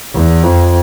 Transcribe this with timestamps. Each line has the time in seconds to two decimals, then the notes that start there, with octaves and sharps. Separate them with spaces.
0.14 E2
0.43 F2